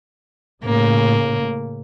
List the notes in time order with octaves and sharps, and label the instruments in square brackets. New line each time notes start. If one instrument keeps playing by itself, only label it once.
[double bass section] A2 C#3 [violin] A#3